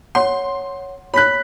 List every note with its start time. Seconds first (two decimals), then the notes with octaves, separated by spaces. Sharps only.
0.15 C#5 F#5 C6
1.14 C#5 B5 F#6 B6